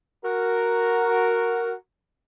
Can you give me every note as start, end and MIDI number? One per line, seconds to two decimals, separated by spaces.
0.25 1.73 66
0.25 1.73 70